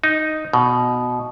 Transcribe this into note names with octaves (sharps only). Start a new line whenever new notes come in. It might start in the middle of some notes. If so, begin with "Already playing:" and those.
D#4
B2